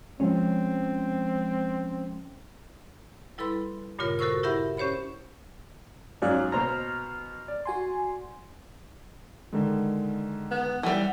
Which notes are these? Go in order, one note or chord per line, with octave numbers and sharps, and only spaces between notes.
F3 G#3 C4 C#4
G3 E4 A4 B4 B5 C6
G2 A#2 C#3 F4 A#4 C#5
F#4 A4 A#4 C5 C#6 E6
E4 G4 A#4 E5 F#5 B5
C#4 G4 C5 C#5 B5
G#2 F#3 C#4 D5 F5 F#6
B2 C5 A#5 F6
D5
F#4 G#5 C6
D3 D#3 G#3
B3
E3 G3 E4 F#5